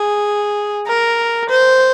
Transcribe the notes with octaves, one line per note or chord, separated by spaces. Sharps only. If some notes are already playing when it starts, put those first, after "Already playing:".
Already playing: G#4
A#4
C5